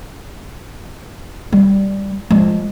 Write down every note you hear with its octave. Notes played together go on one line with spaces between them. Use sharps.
G3
F3 G#3